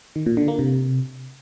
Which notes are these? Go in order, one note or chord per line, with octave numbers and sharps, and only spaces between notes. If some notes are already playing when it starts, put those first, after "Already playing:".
D#3
A#2
D3
A#3
C3